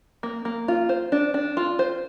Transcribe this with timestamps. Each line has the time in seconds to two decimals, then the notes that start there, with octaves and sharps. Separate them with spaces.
0.23 A#3
0.45 A#3
0.68 F4
0.89 C5
1.12 D4
1.34 D4
1.57 F4
1.79 C5